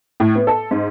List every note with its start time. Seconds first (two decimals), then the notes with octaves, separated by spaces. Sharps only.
0.20 A2
0.35 B3
0.47 A4
0.71 G#2